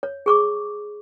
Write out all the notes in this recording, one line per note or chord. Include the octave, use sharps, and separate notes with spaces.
C#5
G#4 C#6 D6